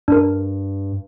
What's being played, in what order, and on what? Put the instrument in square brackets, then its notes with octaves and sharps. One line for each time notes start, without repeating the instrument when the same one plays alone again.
[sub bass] G2 [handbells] D4 A#4